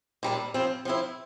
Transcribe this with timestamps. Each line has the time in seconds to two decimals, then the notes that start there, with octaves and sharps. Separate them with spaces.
0.23 A#2 G3 D4
0.54 F3 C4 E4
0.85 F3 C4 E4